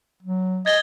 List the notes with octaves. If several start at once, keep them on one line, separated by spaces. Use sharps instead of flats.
F#3
D#5 G#6 A6 G7